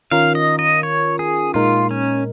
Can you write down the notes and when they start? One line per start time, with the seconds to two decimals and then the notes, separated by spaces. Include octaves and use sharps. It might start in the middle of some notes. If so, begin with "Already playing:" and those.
0.11 D#3 C#4 F4 A#4 F5
0.35 D#5
0.59 D#5
0.83 C#5
1.19 G#4
1.54 A#2 G#3 D#4 F4 A#4
1.91 C#4